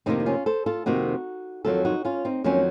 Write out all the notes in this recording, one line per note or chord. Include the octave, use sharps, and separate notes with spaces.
F2 C3 D#3 A#3 C4 D#4
D#4
C#4 F4
A4 C5
F4 A4
F2 C3 D#3 A#3 D#4 F#4
F2 D#3 F#3 F4 A4
D#4 F#4
C#4 F4
C4 D#4
F2 D#3 F#3 A#3 C#4